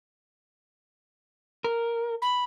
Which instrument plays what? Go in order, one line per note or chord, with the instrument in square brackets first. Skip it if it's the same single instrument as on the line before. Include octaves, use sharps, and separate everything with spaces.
[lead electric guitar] A#4
[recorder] B5